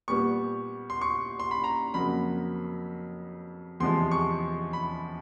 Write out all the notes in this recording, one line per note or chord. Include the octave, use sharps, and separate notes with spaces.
A#2 G3 B3 C#6
C6
C#6
C6
B5
A#5
F2 C#3 F#3 A#3 B5
E2 C3 F3 G#3 C6
C#6
B5